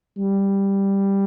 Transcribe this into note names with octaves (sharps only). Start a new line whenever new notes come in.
G3